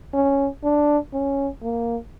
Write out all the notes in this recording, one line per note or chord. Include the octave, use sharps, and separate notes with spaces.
C#4
D4
C#4
A#3